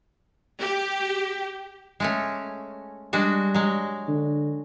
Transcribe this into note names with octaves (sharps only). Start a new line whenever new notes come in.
G4
G#3 A3 C#4
G3 G#3 D4 F#4
F#3 G#3
D3